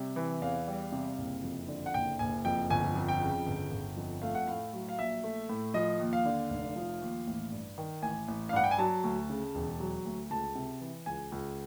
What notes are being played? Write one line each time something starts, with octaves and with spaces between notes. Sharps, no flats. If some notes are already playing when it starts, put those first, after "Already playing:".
Already playing: C3 G3
E3
E2 F5
G3
C3
F#1
F2
D3
F#5
F#1 G5
F#1 G#5
F2 G5
G1 G#5
F2
G5
C#3
G1
G1
F2
A3 F5
F#5
A2 F5
F#3
F5
A#1 E5
A3
A2
F3 D#5
D#2
F5
D3
F1
F3
D#2
A1
G2
D#3
A1 G#5
A1
F5
G2 F#5
G5
G#5
F#3 A5
D2
C#3
E1
F#3
D2
C#2 A5
C3
E3
C#2 G#5
C#2